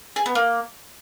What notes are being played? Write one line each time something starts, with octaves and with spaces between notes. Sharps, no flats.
G#4
B3
A#3